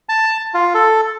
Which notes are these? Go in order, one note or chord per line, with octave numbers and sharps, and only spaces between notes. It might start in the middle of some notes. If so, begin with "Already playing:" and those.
A5
F4
A4